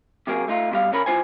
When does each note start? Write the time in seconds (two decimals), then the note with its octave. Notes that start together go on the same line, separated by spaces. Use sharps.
0.27 C3 F#3 A#3 G#4
0.48 A3 D#4 F4
0.71 B2 G3 F5
0.92 C#3 C#4 A#4 B5
1.06 D#2 E3 D4 F4 C5 G#5